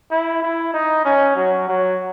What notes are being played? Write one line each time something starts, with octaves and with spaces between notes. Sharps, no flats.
E4
E4
D#4
C#4
F#3
F#3